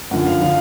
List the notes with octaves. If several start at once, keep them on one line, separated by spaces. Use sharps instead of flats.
F#2 D3 F3 F#5
F5
D3 F3 F5